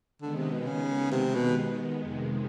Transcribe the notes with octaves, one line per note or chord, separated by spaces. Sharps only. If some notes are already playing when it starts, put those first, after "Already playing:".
D3 D#3 G#3 B3
C3
B2
C#3
C3
B2
F2 C3 D#3 G#3